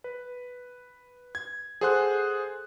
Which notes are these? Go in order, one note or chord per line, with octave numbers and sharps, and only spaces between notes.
B4
G#6
G#4 A4 C5 F#5 C6 F#6